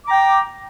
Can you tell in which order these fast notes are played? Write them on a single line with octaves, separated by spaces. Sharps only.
D6 A#5 G5